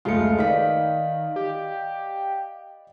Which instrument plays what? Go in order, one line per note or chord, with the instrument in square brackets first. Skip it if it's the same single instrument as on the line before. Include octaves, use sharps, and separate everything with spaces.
[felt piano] F#1 D2 G#3 [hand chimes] A3 A4 C#7 [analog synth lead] F4
[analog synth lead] D#3 [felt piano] B4 D5 D#5 [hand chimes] F5 B6
[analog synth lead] G4